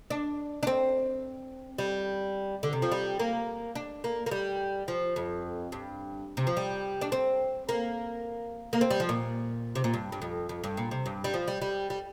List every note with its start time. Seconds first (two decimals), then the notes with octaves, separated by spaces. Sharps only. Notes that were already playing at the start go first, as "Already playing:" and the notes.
0.10 D4
0.63 D4
0.67 C4
1.78 G3
2.63 D3
2.73 C3
2.82 F3
2.91 G3
3.19 A#3
3.75 D4
4.04 A#3
4.26 A#3
4.31 G3
4.88 F3
5.16 F2
5.72 G2
6.37 C3
6.47 F3
6.57 G3
7.01 D4
7.12 C4
7.69 A#3
8.73 A#3
8.81 C4
8.91 G3
9.00 F3
9.09 A#2
9.75 C3
9.84 A#2
9.94 G2
10.12 G2
10.22 F2
10.49 F2
10.64 G2
10.77 A#2
10.91 C3
11.06 G2
11.24 G3
11.34 F3
11.48 G3
11.62 G3
11.90 G3